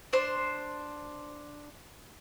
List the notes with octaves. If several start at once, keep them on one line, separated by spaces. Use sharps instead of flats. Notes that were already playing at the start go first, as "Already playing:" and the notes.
D4 C5 C6